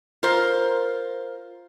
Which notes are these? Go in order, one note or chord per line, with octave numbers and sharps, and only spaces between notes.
F4 A#4 C5